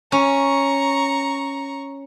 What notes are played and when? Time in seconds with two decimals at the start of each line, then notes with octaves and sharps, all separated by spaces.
0.12 C#4 A#5 C#6